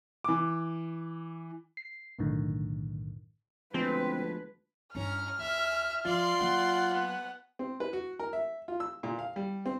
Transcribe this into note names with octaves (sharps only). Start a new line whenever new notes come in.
E3 D6
C7
B1 F#2 A2 D3 D#3
D2 F3 G#3 B3 C4 B4
G2 C#4 E4 A#5 F6
D#2 E5
F3 F4 D5 C6
F#3 A#3 F#5
B3
C4
B4
F#4
A#4
E5
F4
E6
A#2
F5
G3
C4